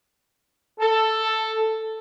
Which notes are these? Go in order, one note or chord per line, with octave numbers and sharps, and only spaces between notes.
A4